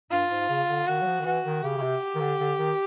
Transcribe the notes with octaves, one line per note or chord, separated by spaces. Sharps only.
G2 F4
G#2
C#3
D3
D#3 F#4
F#3
F3
D#3
E3 F#4
D#3
C#3 G4
C#3
C3
D#3
D3
D3
D#3